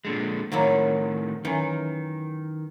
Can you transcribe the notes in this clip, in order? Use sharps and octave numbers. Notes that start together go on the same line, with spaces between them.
A#2 D3 G#3
A2 D#3 F#3 A#3 E4
F#2 D#3 E3